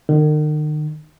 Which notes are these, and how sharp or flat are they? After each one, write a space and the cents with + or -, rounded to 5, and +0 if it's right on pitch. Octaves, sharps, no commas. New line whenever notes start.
D#3 -40